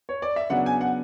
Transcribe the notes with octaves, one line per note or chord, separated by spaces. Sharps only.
C#5
D5
E5
C#3 F#3 B3 D4 F#5
G#5
F#5